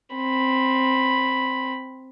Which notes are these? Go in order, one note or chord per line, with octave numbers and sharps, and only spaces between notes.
C4 B5